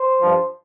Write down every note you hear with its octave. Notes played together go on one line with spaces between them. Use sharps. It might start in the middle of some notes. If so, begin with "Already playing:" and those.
Already playing: C5
G2 F3